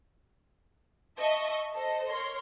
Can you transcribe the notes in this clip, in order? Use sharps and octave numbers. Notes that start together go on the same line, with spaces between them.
D#5 E5 A5 C#6
A4 C5 D#5
A#4 C#5 C6